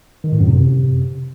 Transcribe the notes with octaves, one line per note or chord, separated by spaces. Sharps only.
D#3
A2
F#2
C3